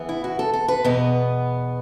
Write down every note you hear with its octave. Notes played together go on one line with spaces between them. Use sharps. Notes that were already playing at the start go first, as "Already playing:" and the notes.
Already playing: E2 E3 B3
E4
F#4
A4
A4
B4
E2 B2 B3